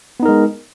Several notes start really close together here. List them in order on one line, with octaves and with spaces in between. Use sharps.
B3 D#4 A#4 G#3